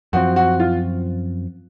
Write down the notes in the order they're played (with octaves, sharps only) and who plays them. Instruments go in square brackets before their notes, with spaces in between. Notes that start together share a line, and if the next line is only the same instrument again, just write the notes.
[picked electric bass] F#2 F3 C4 [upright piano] F#4
[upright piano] F#4
F4